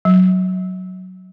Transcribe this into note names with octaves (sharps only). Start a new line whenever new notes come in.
F#3